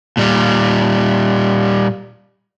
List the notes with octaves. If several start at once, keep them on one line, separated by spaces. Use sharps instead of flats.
A#2 G3